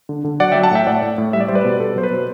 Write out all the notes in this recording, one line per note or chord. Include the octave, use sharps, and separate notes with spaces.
D3
D3
F#3 D5 F#5
F#3 E5 G5
F#5 A5
A2 E5 G5
A2 D5 F#5
A2
A2
G3 E5
D5
G3 C5
B4 D5
B2
B2 A4
F#3 C5
B4
B2